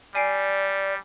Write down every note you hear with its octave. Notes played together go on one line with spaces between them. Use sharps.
G3 D5 G#5 C7 D7